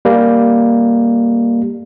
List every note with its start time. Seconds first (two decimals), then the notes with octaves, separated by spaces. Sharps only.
0.05 G3 A#3